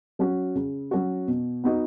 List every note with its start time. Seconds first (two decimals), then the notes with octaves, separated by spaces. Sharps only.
0.19 F#3 C#4 F#4
0.55 C#3
0.91 F#3 C#4 F#4
1.28 B2
1.64 B3 D#4 F#4